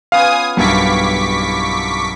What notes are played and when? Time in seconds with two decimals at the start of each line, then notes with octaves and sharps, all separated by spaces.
0.12 B3 C#4 F4 F5 G#5 D#6
0.57 B1 G2 D#3 E4 C#6 D6 B6